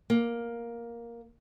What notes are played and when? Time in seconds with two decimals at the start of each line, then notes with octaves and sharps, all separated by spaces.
0.10 A#3